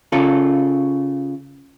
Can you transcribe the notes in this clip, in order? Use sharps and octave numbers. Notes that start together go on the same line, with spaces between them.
C#3 F4 A4